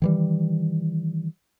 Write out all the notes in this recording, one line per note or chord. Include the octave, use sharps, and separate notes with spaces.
D#3 E3 G3